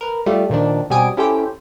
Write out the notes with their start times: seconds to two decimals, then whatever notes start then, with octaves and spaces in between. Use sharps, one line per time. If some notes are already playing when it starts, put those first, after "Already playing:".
0.01 A#4 B4
0.26 G3 A3 F4 G4
0.50 A#2 D#3 F3 D4
0.90 B2 G3 C4 G#5 D#6 D7
1.17 C#4 E4 G4 A4 C5 G5